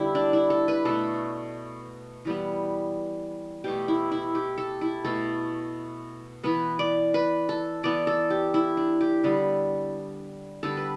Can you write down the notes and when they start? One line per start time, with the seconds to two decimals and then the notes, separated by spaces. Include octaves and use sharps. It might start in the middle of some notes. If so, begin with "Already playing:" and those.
Already playing: D3 G3 B3 E4 G4
0.15 D4
0.33 E4
0.50 A4
0.68 B4
0.85 B2 A3 A4
2.25 E3 G3 B3
3.64 B2 A3 G4
3.88 E4
4.12 E4
4.35 G4
4.58 A4
4.81 E4
5.05 B2 A3 A4
6.44 E3 B3 B4
6.79 D5
7.14 B4
7.49 A4
7.83 E3 B3 D5
8.07 A4
8.30 G4
8.54 E4
8.77 D4
9.01 G4
9.24 D3 G3 B3
10.63 D3 G3 B3 A4
10.77 B4